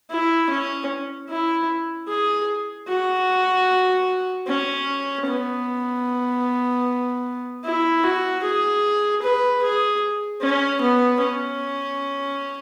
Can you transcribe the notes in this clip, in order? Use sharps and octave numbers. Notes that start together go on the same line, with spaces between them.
E4
C#4
E4
G#4
F#4
C#4
B3
E4
F#4
G#4
B4
G#4
C#4
B3
C#4